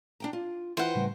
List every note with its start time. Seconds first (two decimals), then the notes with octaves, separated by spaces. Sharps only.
0.20 D4 G5 A#5
0.33 F4
0.77 E3 E4 F4 B4 C5 F#5 G5
0.95 A2 C#3 G3